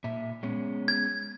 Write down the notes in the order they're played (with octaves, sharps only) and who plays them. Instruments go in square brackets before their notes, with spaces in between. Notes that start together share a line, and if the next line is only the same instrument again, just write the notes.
[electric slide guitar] A#2 E5
G#3 B3 C#4
[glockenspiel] G#6